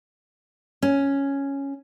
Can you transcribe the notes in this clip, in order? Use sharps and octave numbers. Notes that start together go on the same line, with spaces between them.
C#4